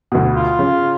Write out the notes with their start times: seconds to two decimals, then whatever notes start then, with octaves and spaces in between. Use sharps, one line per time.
0.12 D2 B2
0.37 F4
0.59 C#3